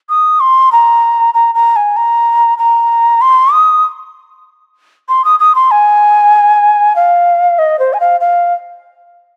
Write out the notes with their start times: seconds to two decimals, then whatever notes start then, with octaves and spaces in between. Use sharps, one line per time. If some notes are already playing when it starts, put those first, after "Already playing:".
0.09 D#6
0.40 C6
0.72 A#5
1.34 A#5
1.55 A#5
1.76 G#5
1.96 A#5
2.58 A#5
3.21 C6
3.52 D#6
5.09 C6
5.25 D#6
5.40 D#6
5.55 C6
5.71 G#5
6.96 F5
7.59 D#5
7.79 C5
7.93 G#5
8.00 F5
8.21 F5